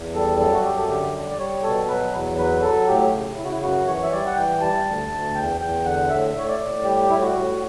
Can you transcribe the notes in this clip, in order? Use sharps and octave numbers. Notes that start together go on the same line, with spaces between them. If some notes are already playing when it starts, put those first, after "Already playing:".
Already playing: E2
G3 A4
F#2 A4
F#4
F#2 G4
A4
D3 G4
G3
D5
G3 C#5
B2 A4
F#3 B4
E2
F#3 B4
F#3 A4
A2 G4
C#3
C#3 E4
F#4
E4
F#2 F#4
E3 C#5
E5
G3 D5
F#5
E3 G5
G3 A5
D2
D2
E2 G5
E2 G5
D3 F#5
A2 E5
A2 C#5
D5
A2
G3 G4
A2 E4
F#4
A2